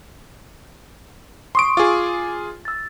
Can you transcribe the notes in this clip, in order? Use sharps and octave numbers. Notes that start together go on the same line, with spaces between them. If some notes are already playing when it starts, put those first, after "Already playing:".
C6 C#6 D#6 D7
F4 G#4 D6
E6 A6